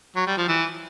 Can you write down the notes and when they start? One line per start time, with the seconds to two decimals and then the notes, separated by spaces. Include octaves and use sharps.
0.16 F#3
0.26 G3
0.37 F3
0.48 E3